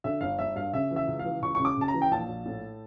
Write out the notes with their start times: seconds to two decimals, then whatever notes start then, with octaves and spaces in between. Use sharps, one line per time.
0.04 D3 E5
0.21 G1 F5
0.39 G1 E5
0.55 G2 F5
0.73 C#3 E5
0.91 E3
0.96 E5
1.08 C#2
1.19 F5
1.25 E3
1.42 C#2 C#6
1.55 C#3 C#6
1.65 D6
1.77 C#3 A5
1.88 A#5
1.94 E3
2.02 G5
2.11 A#1 A5
2.28 A#1
2.46 A2